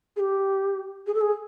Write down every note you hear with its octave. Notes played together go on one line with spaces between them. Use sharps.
G#4
G4
G#4
A4
G#4